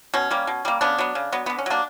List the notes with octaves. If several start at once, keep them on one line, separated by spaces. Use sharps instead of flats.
B2 C#4
G3 A#3
B2
G3 A#3
C#3 B3 D4
F#3 B3
C#3
F#3 B3
D3 B3
C#4
F#3 A#3 D4